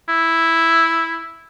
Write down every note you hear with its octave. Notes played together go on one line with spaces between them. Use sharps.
E4